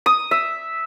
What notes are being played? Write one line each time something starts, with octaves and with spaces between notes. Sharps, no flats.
D#6
E5